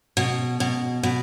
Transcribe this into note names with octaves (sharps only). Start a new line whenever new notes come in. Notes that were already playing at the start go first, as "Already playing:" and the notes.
B2
B2
B2